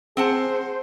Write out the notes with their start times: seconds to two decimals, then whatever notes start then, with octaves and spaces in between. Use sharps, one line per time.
0.17 C4 G#4 C5 F#5 A5